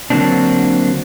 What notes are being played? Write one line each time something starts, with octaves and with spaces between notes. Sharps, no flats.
D3 F#3 A#3 C4 D4